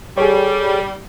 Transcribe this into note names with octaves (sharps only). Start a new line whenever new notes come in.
G3 G#4 A4 C#5